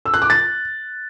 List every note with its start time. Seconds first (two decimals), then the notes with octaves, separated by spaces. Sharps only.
0.05 E6
0.14 F#6
0.22 D6
0.30 A6